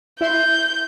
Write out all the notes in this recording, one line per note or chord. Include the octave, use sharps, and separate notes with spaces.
E4 E5 C6 G6